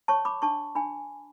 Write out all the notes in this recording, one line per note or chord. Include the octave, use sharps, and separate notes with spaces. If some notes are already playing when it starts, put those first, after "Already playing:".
C#5 A5 C#6
B5 D6
D4 A5 C#6
D4 G#5 B5